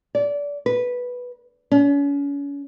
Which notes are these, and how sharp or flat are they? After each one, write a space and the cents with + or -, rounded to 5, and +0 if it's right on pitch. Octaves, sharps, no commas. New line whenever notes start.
D5 -25
B4 -5
C#4 +35